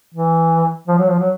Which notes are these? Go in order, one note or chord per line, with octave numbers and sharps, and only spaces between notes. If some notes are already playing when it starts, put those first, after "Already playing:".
E3
F3
F#3
F3
F#3